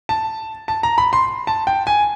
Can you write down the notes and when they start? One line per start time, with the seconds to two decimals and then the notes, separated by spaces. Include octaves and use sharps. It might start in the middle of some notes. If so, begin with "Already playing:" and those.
0.09 A5
0.68 A5
0.83 A#5
0.98 B5
1.13 C6
1.47 A5
1.67 G5
1.87 G#5